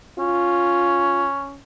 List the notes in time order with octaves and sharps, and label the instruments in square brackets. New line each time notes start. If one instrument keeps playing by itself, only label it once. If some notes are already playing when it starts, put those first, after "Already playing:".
[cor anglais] C#4 [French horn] F4